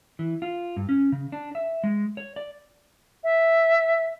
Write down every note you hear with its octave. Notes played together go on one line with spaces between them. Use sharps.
E3
F4
G2
C#4
C#3
D4
E5
G#3
C#5
D5
E5